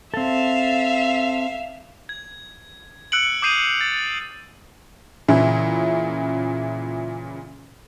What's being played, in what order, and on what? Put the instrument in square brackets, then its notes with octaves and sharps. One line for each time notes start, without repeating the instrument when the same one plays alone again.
[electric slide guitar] C4 A4 [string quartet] E5 F5
[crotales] G#6
E6 F#6 C#7 D7 F#7
D6 D#6 G6 C7 D#7 F7
A6
[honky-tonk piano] A#2 C#3 E3 E4